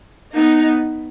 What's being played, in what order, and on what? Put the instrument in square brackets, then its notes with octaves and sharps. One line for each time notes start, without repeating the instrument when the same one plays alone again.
[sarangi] B3 [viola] D#4